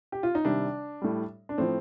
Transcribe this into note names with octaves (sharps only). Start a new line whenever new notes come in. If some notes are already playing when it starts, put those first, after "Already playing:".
G4
F4
D#4
C3 D#3 G3 D4
A2 G3
D4
A2 F3 C4